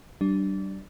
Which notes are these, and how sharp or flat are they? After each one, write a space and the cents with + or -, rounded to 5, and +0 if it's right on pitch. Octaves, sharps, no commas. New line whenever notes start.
G3 -30 D4 +0